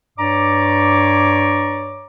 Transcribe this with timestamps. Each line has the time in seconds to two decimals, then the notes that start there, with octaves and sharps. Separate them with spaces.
0.18 G2 C#5 D5 A#5 D6